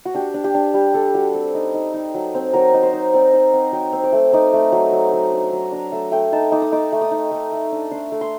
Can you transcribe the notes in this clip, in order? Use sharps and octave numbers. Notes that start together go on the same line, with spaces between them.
F#4
D4 G4
D4
G4
D4
G3 G4
D4 A4
G3 F#4
C4 G4
D#4
D#4
D#4
F#3
C4
F#3 A#4
D#4
C5
D#4
C4 D5
D#4 D#5
C4 F#5
F#3 G5
C4
D6
A3
D#4 D6
A3
F#3
F#3
F#3
D4
F#3 A#5
D4 A#5
A3 A5
A3 G5
D#4 A5
D#4 D6
D#6
D#4 D6
A3
D#6
D#4
A3 D6
A3
D4
D4 C6
A3
C6